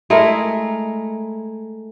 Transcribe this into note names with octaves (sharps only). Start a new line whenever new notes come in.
G#3 A3 E4 A#4